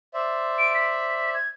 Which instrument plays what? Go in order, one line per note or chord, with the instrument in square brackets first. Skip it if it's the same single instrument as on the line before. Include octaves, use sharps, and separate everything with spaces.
[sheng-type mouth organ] C5 D5 E5
[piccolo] D7
B6
G#6